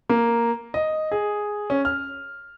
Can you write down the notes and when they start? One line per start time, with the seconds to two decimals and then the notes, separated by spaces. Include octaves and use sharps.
0.09 A#3
0.74 D#5
1.11 G#4
1.70 C#4
1.85 F6